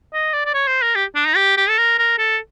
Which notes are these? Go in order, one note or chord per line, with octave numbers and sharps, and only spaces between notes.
D#5
D5
D5
C#5
C5
A#4
G4
D4
D#4
G4
G4
A4
A#4
A#4
A4